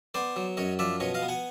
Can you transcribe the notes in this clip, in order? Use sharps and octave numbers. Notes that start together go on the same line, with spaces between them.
B3 C5 D5
F#3
F#2 C#5 D#5
F3 D5 E5
B2 C#5 D#5
D#5 F5
B3
F#5 G#5